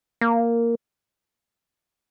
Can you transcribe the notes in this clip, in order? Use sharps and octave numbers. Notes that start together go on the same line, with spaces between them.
A#3